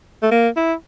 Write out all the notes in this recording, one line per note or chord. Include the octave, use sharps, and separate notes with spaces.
A3
A#3
E4